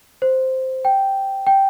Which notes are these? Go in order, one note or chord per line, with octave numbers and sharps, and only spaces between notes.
C5
G5
G5